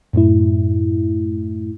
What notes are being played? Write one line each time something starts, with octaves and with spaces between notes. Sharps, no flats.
F#2 A2 A3 E4